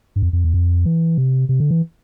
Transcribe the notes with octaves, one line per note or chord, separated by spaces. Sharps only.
G2
F2
F2
E2
F2
E3
C3
C3
D3
E3